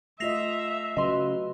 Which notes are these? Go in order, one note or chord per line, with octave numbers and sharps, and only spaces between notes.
A3 F4 D#5 E5 A#6 C7 F7
C#3 F#3 B4 D#5 C6